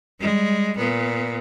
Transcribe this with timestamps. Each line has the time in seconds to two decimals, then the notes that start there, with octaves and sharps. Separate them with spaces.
0.20 G3 G#3
0.78 A#2 B3